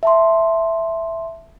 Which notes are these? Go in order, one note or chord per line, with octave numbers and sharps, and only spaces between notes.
E5 A5 C6